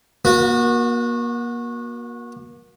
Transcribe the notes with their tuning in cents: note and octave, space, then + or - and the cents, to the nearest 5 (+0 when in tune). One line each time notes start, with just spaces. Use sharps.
A#3 +30 F#4 -25